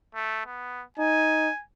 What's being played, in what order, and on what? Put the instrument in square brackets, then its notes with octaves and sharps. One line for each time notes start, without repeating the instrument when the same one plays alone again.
[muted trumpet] A3
B3
[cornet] D#4 [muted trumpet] G#5